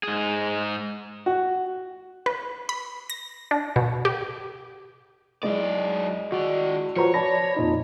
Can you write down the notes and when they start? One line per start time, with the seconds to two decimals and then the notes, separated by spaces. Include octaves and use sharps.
0.03 G#2 G#4
1.26 F#4
2.26 B4
2.69 B5
3.10 A#6
3.51 D4
3.76 B2
4.05 G4
5.43 F#2 G#3 E4 D5 D#5
6.32 D#3 F#4 D5
6.96 F3 F#4 B4 C#5 A#5
7.14 D5 A5 B5 A#6
7.56 F2 A#2 D#4